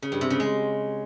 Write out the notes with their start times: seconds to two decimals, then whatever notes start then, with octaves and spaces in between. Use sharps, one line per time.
0.02 C#3
0.12 G2
0.21 C3
0.30 C#3
0.40 G#3